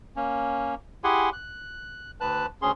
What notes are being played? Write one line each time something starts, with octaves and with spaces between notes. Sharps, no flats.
A#3 C#4
E4 G4 G#4 F#5 G#5 C6
F#6
D2 B4 A5 F#6
D2 C#4 G#4 C6